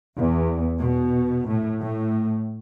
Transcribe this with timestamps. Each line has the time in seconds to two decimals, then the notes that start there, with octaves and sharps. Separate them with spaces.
0.16 E2
0.78 B2
1.48 A2
1.81 A2